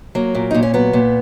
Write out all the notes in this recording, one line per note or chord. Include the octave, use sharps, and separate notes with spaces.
F#3 A#3
A#2
A#2 D#4
C#4
F#3 B3
A#2